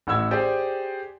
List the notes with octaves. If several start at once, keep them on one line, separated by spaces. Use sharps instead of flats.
A1 A2 F#5 E6 G#6
G4 G#4 C5 D5